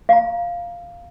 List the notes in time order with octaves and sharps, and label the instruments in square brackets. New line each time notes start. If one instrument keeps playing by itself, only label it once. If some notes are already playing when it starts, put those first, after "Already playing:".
[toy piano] F5 A#5